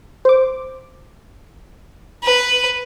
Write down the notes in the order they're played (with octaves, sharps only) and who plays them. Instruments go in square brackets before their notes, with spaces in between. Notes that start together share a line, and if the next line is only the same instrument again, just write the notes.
[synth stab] C5 D6
[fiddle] B4